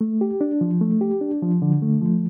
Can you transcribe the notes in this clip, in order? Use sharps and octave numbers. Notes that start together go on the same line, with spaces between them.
A3
G4
D4
F3
A3
G4
D4
F3
D3
A3
F3